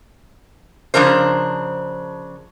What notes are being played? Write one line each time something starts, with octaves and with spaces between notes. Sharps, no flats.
C#3 F3 D4 A#4 C5